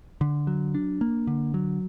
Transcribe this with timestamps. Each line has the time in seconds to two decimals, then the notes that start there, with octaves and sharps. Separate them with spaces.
0.21 D3
0.47 F#3
0.75 D4
1.01 A#3
1.27 D3
1.54 F#3